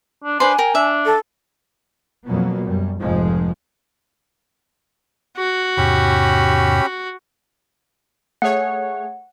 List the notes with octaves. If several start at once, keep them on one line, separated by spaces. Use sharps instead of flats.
D4
D4 B4 C5 G#5 C6
A#4 G5
D4 E5
A4
F2 B2 F#3 A#3 B3
F#2 G3
F1 F2 G#2 F3 G#3
F#4
E2 G#2 C3 C#4 G4 B5
A3 G#4 C#5 F#5